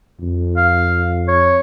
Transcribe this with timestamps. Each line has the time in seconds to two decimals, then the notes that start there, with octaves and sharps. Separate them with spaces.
0.20 F2
0.57 F5
1.28 C#5